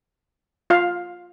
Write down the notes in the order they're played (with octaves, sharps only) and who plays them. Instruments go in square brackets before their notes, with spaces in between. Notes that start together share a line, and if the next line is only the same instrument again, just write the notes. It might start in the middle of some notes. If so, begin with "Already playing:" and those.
[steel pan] F4 F5